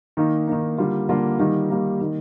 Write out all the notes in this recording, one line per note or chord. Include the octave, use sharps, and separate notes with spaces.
D#3 A#3 D#4
D#3 A#3 D#4
D3 G3 A#3 F4
D3 G3 A#3 F4
D#3 G3 A#3 D#4
D#3 G3 A#3 D#4
D#3 A#3 D#4